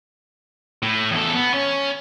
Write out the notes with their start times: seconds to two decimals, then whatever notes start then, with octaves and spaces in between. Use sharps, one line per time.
0.83 A2
1.11 E2 A4
1.34 B3
1.54 C#4